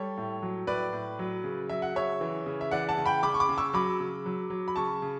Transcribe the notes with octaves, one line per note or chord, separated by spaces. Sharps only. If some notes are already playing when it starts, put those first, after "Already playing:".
Already playing: G3 A4 C#5
A2
F#3
A2 B4 D5
A2
F#3
C#3
F#3 E5
F#5
C#3 C#5 E5
E3
C#3
E5
E3 D5 F#5
F#5 A5
C#3
G5 B5
C#3 B5 D6
C#6
B5 D6
C#3
C#6 E6
F#3 B5 D6
C#3
F#3
F#3
B5
C#3 A5 C#6
C#3